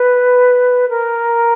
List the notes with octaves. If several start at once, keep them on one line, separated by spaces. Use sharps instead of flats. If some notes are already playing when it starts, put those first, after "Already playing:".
Already playing: B4
A#4